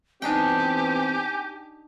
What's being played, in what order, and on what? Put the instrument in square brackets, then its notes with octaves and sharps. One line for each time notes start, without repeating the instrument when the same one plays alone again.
[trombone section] E3 B3 C4 [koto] D4 D#4 G5 [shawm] G4 [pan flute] G#5